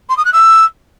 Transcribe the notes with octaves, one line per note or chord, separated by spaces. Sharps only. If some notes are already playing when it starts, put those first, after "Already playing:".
C6
D#6
F#6
E6